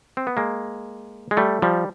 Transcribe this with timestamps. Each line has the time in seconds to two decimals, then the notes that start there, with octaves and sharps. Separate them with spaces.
0.17 C4
0.27 B3
0.37 G#3 A#3
1.31 G#3
1.37 G3 A3
1.62 F3 G3